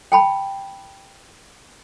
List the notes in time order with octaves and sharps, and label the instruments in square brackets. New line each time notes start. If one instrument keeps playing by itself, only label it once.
[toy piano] G5 A5 B5